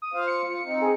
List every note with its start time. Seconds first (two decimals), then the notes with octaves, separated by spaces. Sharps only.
0.02 D#6
0.14 F4 C5 F5
0.27 C#7
0.46 F4
0.65 C4 D#4
0.82 G#4